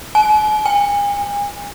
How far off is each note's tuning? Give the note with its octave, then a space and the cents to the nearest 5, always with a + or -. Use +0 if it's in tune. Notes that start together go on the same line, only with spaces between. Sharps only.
G#5 +45
G#5 -35